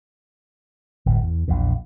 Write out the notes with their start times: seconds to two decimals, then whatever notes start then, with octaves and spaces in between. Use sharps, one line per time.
1.06 D1 G1 A2
1.23 E2
1.48 A#1 E2 A#2